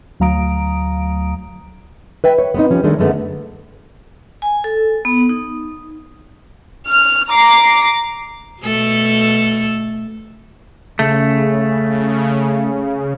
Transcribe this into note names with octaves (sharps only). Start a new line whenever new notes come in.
D2 F#3 F5 A#5 D#6 D7
B4 E5 G5
C#5
B3 C4 D#4
F3 C#4 G4
D#3 G#3 A3 D4
F#2 D3 G#3 A3 B3
G#5
A4
B3
D#4
F6
A#5 D6 C7
B2 A3 A4
C#3 A3